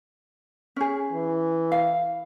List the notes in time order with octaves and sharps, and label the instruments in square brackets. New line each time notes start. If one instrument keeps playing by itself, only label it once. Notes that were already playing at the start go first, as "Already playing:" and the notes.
[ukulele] C#4 G#4
[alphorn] E3
[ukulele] F5